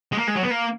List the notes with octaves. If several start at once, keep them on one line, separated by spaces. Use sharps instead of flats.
G#3
A#3
G#3
F#3
B3
A#3